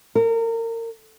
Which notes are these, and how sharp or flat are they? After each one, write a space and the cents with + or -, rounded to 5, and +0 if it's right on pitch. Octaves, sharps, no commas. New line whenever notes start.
A#4 -30